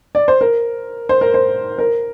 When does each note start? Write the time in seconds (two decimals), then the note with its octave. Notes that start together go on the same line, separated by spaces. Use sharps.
0.15 D5
0.28 C5
0.41 A#4
1.09 C5
1.21 A#4
1.34 C5
1.79 A#4